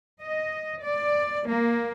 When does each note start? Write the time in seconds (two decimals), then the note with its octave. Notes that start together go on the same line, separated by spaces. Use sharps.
0.22 D#5
0.81 D5
1.47 A#3